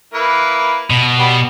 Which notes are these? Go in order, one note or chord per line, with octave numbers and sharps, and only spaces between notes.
A#3 E4 B4
B2
G3 B3